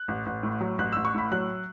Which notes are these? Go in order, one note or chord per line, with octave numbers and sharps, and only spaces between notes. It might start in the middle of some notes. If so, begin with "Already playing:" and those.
Already playing: F#6
A1
A1
A2
F#3
A1 F#6
A1 E6
C#6
A2 B5
F#3 F#6